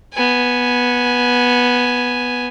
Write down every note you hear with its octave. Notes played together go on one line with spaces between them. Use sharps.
B3 G#5